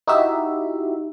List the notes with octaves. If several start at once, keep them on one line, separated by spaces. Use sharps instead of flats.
D#4 E4 F#4 G4 E5